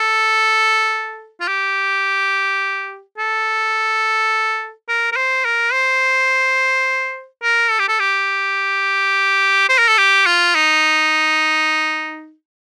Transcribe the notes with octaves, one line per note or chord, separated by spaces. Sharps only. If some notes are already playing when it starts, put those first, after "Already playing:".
Already playing: A4
F4
G4
A4
A#4
A#4
C5
A#4
C5
A#4
A4
G4
A4
G4
C5
A#4
A4
G4
F4
D#4